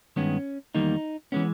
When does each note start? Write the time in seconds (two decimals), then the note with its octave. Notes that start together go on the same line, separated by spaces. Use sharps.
0.16 G2 D#3 G#3 B3 C#4
0.75 E2 D#3 G3 A#3 D#4
1.32 E3 G#3 B3 C#4